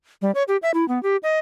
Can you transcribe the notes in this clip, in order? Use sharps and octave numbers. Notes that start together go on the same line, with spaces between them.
G3
C#5
G4
E5
E4
B3
G4
D#5